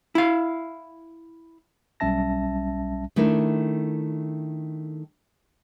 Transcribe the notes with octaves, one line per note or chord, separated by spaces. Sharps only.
E4 F5
B1 G3 C#4 E5 A5 A#6
D#3 A3 D4 E4 A#4